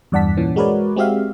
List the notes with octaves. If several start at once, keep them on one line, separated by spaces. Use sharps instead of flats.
E2 G2 D5 F#5 A5 B6
A#2 E3 C#4
G#3 F#4 A#4 B4 C#5 D5
G#3 C4 F#4 G4 E5 F5